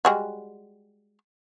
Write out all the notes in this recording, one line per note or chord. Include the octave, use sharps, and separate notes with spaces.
G3 G#3 F#4